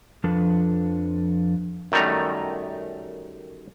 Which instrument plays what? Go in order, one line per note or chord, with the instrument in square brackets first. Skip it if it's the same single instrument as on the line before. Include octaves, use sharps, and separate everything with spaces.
[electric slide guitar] F2 F3 D4 A4 B4
[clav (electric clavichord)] F#2 D#3 G3 A3 A#5